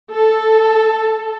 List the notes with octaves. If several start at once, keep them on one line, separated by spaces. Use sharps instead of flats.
A4